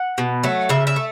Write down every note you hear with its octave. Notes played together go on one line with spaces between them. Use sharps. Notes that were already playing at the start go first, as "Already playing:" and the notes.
Already playing: F#5
B2
F#3 A3
C#3 E5
E5
A3